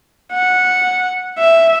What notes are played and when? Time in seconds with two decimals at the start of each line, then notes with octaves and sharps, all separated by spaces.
0.33 F#5
1.38 E5